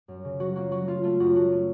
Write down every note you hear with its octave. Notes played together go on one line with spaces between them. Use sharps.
F#2
C#3
F#3 F#4
A#3 F#4
F#3 F#4
A3 F4
A3 F4
F#2 F#4
A3 F#4
A3